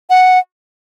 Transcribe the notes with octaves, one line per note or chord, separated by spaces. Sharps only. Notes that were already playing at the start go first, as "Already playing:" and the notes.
F#5